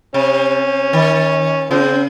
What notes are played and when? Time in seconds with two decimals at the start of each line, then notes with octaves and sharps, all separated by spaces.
0.14 C3 C#4
0.93 D#3
1.71 C#3 F3 C4